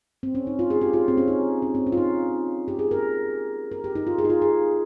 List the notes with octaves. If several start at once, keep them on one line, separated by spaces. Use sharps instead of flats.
C4
C#4
D#4
F4
G#4
G4
F4
C4
C#4
D#4
C#4
C4
C#4
F4
D#4
G4
G#4
A#4
A#4
G4
D#4
F4
G#4
D#4
F4
G#4